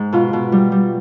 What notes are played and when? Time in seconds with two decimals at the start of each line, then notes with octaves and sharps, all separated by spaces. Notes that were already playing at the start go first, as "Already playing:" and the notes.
Already playing: G#2
0.13 B2 F4
0.33 B2
0.52 G3
0.72 G3